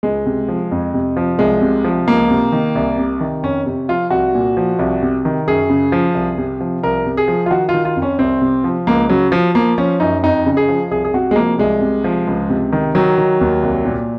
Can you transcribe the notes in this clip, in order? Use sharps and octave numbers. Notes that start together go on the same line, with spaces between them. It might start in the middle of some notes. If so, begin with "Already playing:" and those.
C#2 G#3
C3
F3
F2
C3
F3
C2 G#3
C3
F3
C#2 A#3
C3
D#3
C2
C3
D#3
F2 C#4
C3
F3 F4
C2 F#4
A#2
F3
C2
C3
D#3
F#2 G#4
C#3
F3
C2
C3
F3
C2 A#4
C3
G#4
F3
F4
D#3 F#4
F4
D#3
F4
F2
C#4
C2 C4
C3
F3
C#2 A#3
C#3 F#3
F3
F3 A#3
F3 C#4
F#2 D#4
F2 D#4
C#3
G#4
F3
C2 G#4
G#4
C3 F#4
G#3
F3 A#3
C2 G#3
C3
F3
C#2
C3
D#3
D#3 F#3
D#3
D#2
C2
A#2